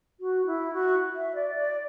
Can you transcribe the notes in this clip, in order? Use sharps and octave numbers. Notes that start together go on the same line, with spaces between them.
F#4
E4
F#4
E5
D5
D5